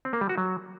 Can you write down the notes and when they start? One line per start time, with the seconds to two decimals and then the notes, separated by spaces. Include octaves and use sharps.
0.05 C4
0.13 A#3
0.21 G3
0.29 F#4
0.38 F#3